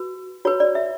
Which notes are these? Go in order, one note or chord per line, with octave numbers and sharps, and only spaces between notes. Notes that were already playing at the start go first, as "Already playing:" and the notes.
Already playing: F#4 B4
F#4 B4 C#5
D5
E5